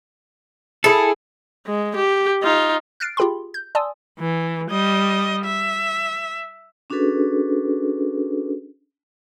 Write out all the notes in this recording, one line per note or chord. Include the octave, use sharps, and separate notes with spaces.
E4 G#4 A4
G#3
G4
D#4 F4
F6 F#6 A6 C7 D7
F4 G4 G#4 G5 B5 C6
G6
D5 G#5 A5 C6 D#6 E6
E3
G3 D#5
E5
C#4 D4 F#4 G#4 A4 B4